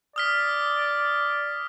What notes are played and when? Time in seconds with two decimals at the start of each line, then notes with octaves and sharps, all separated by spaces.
0.16 D5 D#6 F6 B6